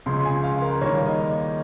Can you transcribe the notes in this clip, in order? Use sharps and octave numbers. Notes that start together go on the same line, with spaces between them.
C#2 C#3 F3 C6
G#5
F5
A#4
D#2 D#3 G3 A#3 C#5
D#5